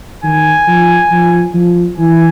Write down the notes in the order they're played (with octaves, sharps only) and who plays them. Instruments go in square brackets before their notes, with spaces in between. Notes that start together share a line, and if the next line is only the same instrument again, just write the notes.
[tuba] D#3 [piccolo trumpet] G#5
[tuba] F3
F3
F3
[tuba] E3 [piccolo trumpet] G#5